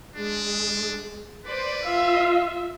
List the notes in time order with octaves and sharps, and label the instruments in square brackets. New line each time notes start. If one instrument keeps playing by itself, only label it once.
[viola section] G#3 [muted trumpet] D4
[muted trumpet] B4 [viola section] C5 D5
[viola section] F4 E5 [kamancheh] F5